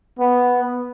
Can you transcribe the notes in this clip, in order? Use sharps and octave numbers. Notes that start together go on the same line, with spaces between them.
B3